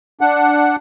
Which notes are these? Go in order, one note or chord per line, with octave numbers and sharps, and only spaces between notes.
D4 F#5